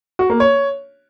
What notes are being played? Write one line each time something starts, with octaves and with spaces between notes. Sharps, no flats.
F#4
A#3
C#5